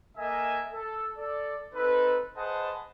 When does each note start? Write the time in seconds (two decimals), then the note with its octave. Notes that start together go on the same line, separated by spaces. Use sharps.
0.18 A#3 A4 D#5 E5 G#5
0.73 A4
1.17 A4 D5
1.74 C4 D#4 A4 B4
2.35 G#4 B4 C5 D#5 F#5 A5